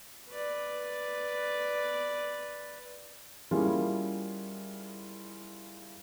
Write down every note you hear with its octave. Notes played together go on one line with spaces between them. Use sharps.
B4 D5
G3 A#3 C#4 E4 F4 G#4